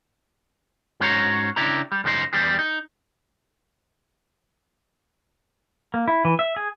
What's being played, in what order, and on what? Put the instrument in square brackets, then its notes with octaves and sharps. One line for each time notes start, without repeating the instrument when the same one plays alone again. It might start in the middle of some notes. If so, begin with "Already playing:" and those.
[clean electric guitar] G#2 C#4 F#4 C5 C#5 A#5
C#3 D4 E4 G4 A#5
G3
F#2 C#3 F3 D#4 C5
E2 G3 G4 G#4
D#4
[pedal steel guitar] A#3
E4
E3
E5
G#4